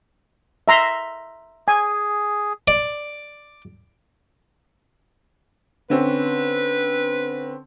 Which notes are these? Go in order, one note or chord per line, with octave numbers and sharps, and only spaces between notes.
E5 A#5 C6
G#4 G#5
D5
D3 C4 C#4 B4